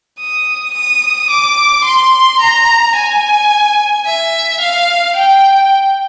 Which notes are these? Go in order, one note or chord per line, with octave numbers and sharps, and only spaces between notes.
D#6
D#6
D6
C6
A#5
G#5
E5
F5
G5